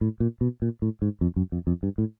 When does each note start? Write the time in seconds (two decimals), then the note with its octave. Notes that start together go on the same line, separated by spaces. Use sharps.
0.01 A2
0.20 A#2
0.41 B2
0.62 A#2
0.82 A2
1.02 G#2
1.21 F2
1.36 F#2
1.52 F2
1.67 F2
1.83 G2
1.98 A2